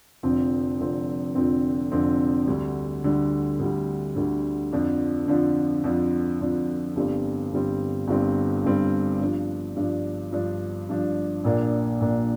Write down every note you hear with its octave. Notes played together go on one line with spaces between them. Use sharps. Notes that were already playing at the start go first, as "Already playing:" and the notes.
F1 F2 D3 F3 C4
F1 F2 D3 F3 C4
F1 F2 D3 F3 C4
F1 F2 D3 F3 C4
D2 D3 G3
D2 D3 G3
D2 D3 G3
D2 D3 G3
F2 D3 F3 D4
F2 D3 F3 D4
F2 D3 F3 D4
F2 D3 F3 D4
G1 G2 G3 C4
G1 G2 G3 C4
G1 G2 G3 C4
G1 G2 G3 C4
G2 F3 D4
G2 F3 D4
G2 F3 D4
G2 F3 D4
A#1 A#2 A#3 D4
A#1 A#2 A#3 D4